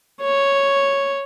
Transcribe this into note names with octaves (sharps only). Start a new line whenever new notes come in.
C#5